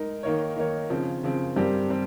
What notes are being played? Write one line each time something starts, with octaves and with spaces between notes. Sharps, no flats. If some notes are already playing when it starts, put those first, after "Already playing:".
Already playing: G#3 D#4 A#4
D#3 A#3 D#4 A#4 C#5
D#3 A#3 D#4 A#4 C#5
C#3 F3 C4
C#3 F3 C4
G2 G3 C4 G4 A#4
G3 C4